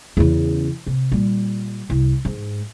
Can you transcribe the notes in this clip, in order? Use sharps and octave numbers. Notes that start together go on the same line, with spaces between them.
E2 C#3
C3
A#2 G3
C2
G#2